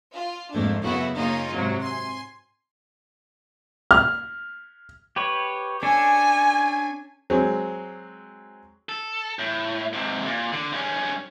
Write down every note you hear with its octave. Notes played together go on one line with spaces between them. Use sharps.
F4
F2 G#2 A3 A#3 D4
F#2 C#3 A3 B3 E4 F#4
C#3 A#3 D#4 F4
G#2 C3 F#3
G#5 C6
F6
G4 B4 C#5
C#4 D4 A4 G#5
F#3 G#3 C4
A4
A2
G#2 C3
A#2
D3
G2 C#4